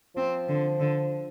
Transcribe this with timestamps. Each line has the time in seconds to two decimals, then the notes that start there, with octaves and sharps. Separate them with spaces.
0.16 F3 C4
0.48 D3
0.80 D3